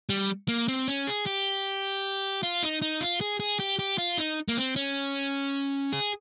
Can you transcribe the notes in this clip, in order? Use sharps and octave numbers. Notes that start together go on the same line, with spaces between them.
G3
A#3
C4
C#4
G#4
G4
F4
D#4
D#4
F4
G#4
G#4
G4
G4
F4
D#4
A#3
C4
C#4
G#4